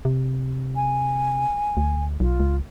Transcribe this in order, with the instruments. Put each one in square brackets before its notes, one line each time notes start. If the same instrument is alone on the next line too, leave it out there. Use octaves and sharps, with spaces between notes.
[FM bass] C3
[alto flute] G#5
[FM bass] D2
[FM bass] B1 [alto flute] F4
[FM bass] C#2